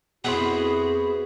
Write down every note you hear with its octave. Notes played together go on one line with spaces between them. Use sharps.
F2 B3 E4 F#4 G#4 C5